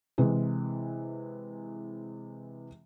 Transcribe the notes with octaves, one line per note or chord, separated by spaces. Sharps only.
C3 E3 G#3